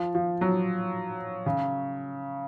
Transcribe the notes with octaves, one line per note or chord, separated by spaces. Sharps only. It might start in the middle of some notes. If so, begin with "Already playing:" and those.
Already playing: F3
F3
F#3
C#3